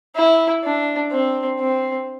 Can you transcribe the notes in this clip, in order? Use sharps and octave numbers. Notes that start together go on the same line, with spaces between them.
E4
D4
C4
C4